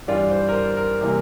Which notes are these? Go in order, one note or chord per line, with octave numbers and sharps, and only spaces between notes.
G2 E3 G3 D4 F4 D5
C5
A#4
C5
A#4
C3 E3 G3 A#3